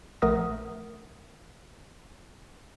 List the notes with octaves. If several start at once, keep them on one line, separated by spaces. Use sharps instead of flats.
A#1 A3 A#4 F#5 D#6 A#6